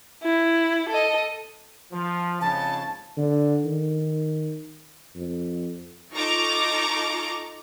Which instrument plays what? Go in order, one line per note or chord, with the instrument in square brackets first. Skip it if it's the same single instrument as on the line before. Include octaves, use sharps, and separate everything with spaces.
[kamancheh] E4
A4 D#5
[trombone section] F3
[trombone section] F2 G#2 C#3 [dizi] A5
[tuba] D3
D#3
F2
[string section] D#4 F4 A4 A#5 C#6 D6